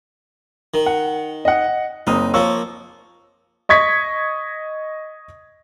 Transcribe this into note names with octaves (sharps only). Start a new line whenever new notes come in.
D#3
F#5
D#5 F#5
F#1 C4 D#4 D#6
F3 A#3 C#5 C#6 E6
D#5 C#6 G#6 B6